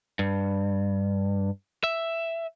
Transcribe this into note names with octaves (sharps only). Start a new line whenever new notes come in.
G2
E5